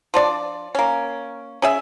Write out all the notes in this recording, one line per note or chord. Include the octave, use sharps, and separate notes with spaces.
F3 D4 D5
A#3 C#4
C#4 G#4 E5